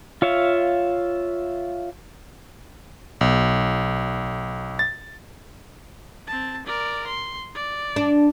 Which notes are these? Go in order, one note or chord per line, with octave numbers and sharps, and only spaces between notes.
F4 C#5 E5 F5
B1
A6
C4 A5
A#4 D5
C6
D5
D4